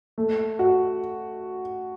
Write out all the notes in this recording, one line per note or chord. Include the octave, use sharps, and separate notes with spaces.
A3
F#4